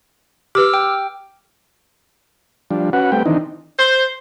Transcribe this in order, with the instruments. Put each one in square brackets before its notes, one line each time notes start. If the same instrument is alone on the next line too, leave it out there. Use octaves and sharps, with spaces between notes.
[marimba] G4 B4 [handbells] D6 E6 F6
[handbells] G5
[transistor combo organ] F3 G3 D4
C#4 F#4 B4 F#5
G3 A3 C4 B4 G5
D#3 E3 C4 D4 D#4
[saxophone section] C5